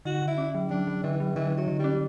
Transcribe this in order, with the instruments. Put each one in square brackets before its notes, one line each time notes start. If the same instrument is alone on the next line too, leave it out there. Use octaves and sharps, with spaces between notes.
[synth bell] D3 [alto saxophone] F#4
[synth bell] D3
[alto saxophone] E4
[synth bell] C#4
F#3
[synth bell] F#3 [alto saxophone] D4
[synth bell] F#3
[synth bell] D3 [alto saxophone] E3
[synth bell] F#3
[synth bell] D3 [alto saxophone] E3
[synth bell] D3
[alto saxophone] F#3
[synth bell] D3
[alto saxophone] G3
[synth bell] C#4